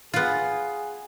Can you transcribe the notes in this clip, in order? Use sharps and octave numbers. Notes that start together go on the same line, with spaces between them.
B3 F4 G#4